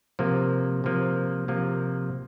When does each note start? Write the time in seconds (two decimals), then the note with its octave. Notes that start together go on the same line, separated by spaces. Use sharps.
0.19 C3 F3 A#3
0.84 C3 F3 A#3
1.48 C3 F3 A#3